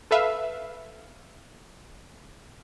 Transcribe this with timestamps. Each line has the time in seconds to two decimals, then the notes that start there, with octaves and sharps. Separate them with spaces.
0.11 A4 B4 E5 F5